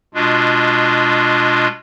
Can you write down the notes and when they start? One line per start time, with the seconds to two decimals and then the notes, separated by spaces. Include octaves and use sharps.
0.14 B2 G#3 D4 F4